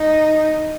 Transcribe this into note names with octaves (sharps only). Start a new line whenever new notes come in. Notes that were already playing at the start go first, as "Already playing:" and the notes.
Already playing: D#4